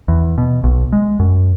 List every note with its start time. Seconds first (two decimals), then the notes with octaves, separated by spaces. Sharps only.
0.08 E2
0.38 B2
0.64 B1
0.93 G#3
1.20 F#2